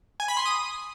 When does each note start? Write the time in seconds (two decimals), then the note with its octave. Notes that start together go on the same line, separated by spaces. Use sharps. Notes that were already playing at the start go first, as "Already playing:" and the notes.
0.20 G#5
0.28 B5
0.37 C6
0.45 D#6